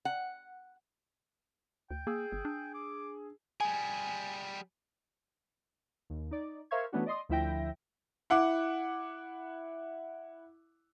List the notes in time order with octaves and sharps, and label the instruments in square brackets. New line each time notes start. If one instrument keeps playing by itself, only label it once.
[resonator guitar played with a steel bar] F#5
[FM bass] D2 [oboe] G5
[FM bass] A#3 [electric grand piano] G#4 E6
[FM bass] G1
D4
[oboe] D6
[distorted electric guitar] G3 G#4 [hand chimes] G#5
[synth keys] D#2
D#4 D5
A#4 C5 E5 F5 C#6 G#6
E3 A3 B3 C#4 D4 F#4
D5 D#5 C6 D#6
D2 F3 E4 E5 G5 A#6
[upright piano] E4 F#5 D6